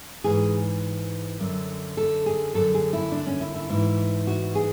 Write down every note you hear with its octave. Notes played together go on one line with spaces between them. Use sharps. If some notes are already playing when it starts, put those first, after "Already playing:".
G#2 E3 G#4
F#2 D3
A4
G#4
F#2 D3 A4
G#4
E4
D4
C#4
E4
E4
G#2 E3 E4
F#4
G#4